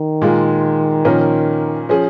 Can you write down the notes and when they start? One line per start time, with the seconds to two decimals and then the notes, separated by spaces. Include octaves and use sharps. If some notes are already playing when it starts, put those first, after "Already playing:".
Already playing: D#3
0.21 A#2 G#3 F4
1.05 A#2 F3 C#4 A#4
1.89 F3 C#4 G#4